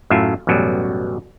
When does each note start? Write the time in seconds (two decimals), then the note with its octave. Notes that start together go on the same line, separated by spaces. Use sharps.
0.10 F#2 A2 F4 E5
0.47 A1 F#2 B2 F#3 G3